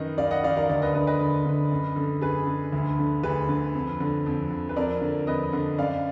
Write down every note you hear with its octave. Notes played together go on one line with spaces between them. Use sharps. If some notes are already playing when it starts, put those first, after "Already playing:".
Already playing: F#2 D#3 B4 D#5
F#2 D5 F5
D#5 F#5
D#3 D5 F5
A#4 D5
D2 A#4 D5
B4 D#5
D3 B4 D#5
B4 D#5
D2
D3
F#2
D3
F#2 G#4 B4
D3
D2
D3
D2 G#4 B4
D3
F2
D3
F2
D3
B4
F2 A#4 D5
D3
F2 B4 D#5
D3
F#2 D5 F5